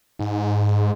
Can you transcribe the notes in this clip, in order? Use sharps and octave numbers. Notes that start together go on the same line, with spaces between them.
G#2